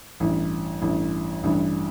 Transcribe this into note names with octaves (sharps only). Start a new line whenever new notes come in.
A1 G2 E3
A1 G2 E3
A1 G2 E3